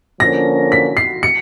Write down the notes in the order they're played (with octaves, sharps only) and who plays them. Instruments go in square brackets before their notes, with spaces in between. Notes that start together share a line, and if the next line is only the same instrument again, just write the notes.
[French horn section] D3 F3 A#3 C#4 [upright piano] A#6
[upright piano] B6
C7
C#7